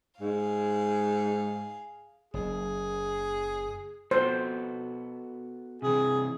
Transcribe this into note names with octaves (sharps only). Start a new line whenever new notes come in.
G#2 G#4 F5
F#1 G#4
B3 F#4 A4 C5
C3 E3 G#4